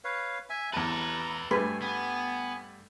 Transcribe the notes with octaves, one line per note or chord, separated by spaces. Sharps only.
B4 C#5 F5
E5 G#5
E2 A4 B4 A5 A#5
G2 A3 B4 G#5
B3 G#5